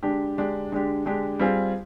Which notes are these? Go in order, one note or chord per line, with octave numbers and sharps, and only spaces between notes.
D3 G#3 D4 G4
D3 G#3 D4 G4
D3 G#3 D4 G4
D3 G#3 D4 G4
G3 C4 F4 G#4